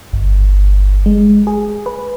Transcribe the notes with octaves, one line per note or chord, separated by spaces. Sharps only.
G1
G#3
G#4
B4